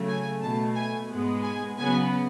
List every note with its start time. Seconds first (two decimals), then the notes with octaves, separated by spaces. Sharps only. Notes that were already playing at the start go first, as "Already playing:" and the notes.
Already playing: C#3 F#3 A3
0.08 G#5
0.42 B2 A3 A5
0.76 G#5
1.10 G#2 G#3 B3
1.43 G#5
1.78 C#3 F#3 B3 G#5